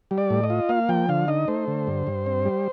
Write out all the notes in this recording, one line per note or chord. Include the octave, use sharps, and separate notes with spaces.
G3
D5
A2
D#5
F4
A#3 F5
F3 G5
D3 F5
D#4 D#5
A3 C5
D3
G2
G2
C4
G3